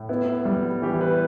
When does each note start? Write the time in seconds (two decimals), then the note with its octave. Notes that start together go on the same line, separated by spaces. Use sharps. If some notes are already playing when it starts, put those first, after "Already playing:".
Already playing: A2
0.09 B3 E4
0.45 G3
0.82 E3 G4
1.01 B4